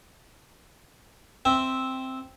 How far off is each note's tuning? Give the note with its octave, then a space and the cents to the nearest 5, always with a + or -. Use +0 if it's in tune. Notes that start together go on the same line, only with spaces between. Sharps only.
C4 +0 E5 -10 G5 +0